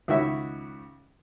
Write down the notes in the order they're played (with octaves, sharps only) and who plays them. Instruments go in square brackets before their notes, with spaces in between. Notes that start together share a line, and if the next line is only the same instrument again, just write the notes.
[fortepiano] C#2 D#3 E4 F#4 C#5 E5